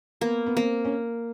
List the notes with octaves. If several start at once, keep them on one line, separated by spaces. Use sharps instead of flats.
A#3 B3
B3
A#3 C4
C#4